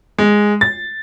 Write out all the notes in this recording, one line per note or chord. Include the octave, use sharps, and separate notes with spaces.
G#3
A6